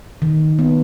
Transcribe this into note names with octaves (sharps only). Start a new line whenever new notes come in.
D#3
B3